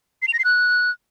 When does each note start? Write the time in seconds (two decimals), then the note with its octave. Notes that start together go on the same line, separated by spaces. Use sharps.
0.22 C7
0.28 F7
0.33 A#6
0.39 C7
0.45 F#6